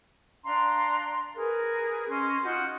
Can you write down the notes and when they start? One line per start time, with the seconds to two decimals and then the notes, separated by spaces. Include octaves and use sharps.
0.43 D4 F5 A#5 C6
1.35 G#4 A#4 B4
2.08 C#4 D#5 C6
2.43 D#4 F4 F#4 G6